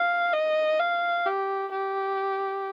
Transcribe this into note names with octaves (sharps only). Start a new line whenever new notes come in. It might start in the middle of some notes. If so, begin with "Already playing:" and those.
Already playing: F5
D#5
F5
G4
G4